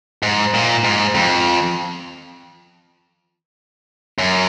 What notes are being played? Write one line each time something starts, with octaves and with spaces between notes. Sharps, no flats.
G#2
A#2
G#2
F2
F#2